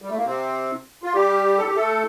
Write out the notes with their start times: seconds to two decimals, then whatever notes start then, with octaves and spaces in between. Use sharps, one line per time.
0.02 G3
0.10 A3
0.17 A#3
0.25 C3 C4
1.03 F4
1.14 G3 G4
1.58 A4
1.67 G4
1.76 A3 A4